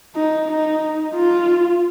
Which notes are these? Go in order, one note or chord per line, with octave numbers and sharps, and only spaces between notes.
D#4
D#4
F4